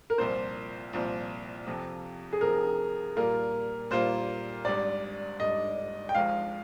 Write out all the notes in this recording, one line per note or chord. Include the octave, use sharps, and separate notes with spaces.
A#4
C2 A#2 F3 C4 C5
C2 A#2 F3 C4
F2 C3 F3
G#4
F2 C3 F3 A#4
A#2 G3 A#3 F4 A#4
A#2 G3 A#3 F4 C5
G#1 G#2 G3 D4 D5
G#1 G#2 G3 D4 D#5
G5
G#1 G#2 F3 G#3 F5